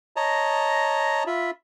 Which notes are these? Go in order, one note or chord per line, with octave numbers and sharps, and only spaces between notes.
C#5 D#5 A5 A#5
F4 E5 B5